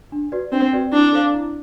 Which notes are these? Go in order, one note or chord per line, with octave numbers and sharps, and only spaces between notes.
D4
F#4 B4 D5
C4 D4
F#4 B4 D5
D4 E4
A4 C5 F5
E4